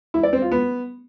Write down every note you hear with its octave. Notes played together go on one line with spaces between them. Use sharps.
E4
D5
C4
F4
B3